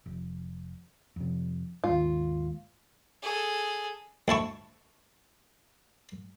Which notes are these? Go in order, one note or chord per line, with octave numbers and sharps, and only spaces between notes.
F1
F2 C3
D#2 G#2 F4
G#4 A4
D2 E4 A5 C#6